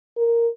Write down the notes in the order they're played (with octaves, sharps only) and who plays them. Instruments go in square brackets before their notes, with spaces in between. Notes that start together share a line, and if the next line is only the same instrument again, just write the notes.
[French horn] A#4